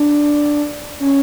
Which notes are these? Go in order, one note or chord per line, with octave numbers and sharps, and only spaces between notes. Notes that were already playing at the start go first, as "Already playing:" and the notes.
Already playing: D4
C#4